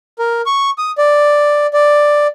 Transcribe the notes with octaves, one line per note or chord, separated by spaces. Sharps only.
A#4
C#6
D#6
D5
D5